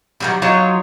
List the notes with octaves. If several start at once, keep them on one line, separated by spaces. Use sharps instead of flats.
D#3 F#3 G3
F#3 D#4 F4 C#5